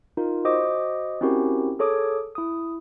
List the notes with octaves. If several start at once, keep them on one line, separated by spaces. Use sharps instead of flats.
D#4 F4 A#4
F#4 C5 D#5 D6 D#6
C4 C#4 E4 F#4 G4 A#4
G#4 A4 C#5 D6 D#6
E4 D#6